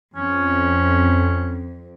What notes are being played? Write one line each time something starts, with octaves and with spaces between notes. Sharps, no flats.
F2 C#4